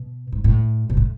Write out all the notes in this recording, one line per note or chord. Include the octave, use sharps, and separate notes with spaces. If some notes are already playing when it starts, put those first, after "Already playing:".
Already playing: B2
G#2
A2
B2
A2